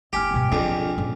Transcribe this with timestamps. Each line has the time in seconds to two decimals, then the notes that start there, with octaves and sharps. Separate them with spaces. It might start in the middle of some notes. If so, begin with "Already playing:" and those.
0.13 F#1 E4 G4 G5 G#5 F6
0.34 G2 B2
0.52 A#1 F2 D4
0.98 F#2 A#2